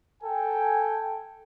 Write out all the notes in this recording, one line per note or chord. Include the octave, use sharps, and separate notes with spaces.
A4 G5 G#5